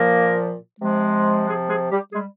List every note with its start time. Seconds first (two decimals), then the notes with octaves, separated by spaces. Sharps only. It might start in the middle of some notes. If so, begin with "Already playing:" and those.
Already playing: A#2 F3 A#3 A#4
0.81 C3 F3 G#3
1.47 G#3 G#4
1.69 G#3 G#4
1.91 G3 G4
2.13 G3 G#3 G#4